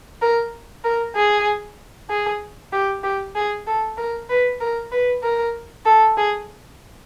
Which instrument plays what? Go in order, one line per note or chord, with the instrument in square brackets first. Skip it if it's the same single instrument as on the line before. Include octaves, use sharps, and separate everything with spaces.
[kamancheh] A#4
A#4
G#4
G#4
G4
G4
G#4
A4
A#4
B4
A#4
B4
A#4
A4
G#4